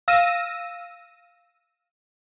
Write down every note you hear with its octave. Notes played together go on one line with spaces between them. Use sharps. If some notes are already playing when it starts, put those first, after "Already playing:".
F5 E6 A#6 D#7